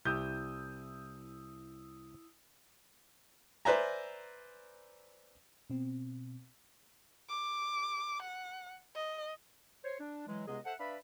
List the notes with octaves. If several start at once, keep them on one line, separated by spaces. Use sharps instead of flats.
C2 E4 G4 D#6 E6 G6
B4 C5 D5 E5 G#5 A#5
B2 C4
D6
F#5
D#5
C5 C#5
D4
E3 F#3 G#3
C#2 C3 G#3 B3 G#4 D#5
A4 C5 E5 F#5
D4 B4 D5 E5 F5 B5